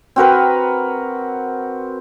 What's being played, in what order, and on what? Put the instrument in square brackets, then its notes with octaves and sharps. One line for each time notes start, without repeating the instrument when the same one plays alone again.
[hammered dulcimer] C4 F#4 A#4 B4